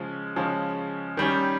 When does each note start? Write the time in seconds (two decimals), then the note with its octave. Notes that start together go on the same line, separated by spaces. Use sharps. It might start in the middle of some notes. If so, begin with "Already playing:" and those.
Already playing: C#3 F3 G#3 C#4
0.36 C#3 F3 G#3 C#4
1.17 D#3 G3 C#4